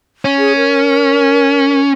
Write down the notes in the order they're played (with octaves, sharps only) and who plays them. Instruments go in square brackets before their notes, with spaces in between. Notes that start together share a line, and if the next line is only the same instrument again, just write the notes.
[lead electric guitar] C#4
[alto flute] G#4
A#4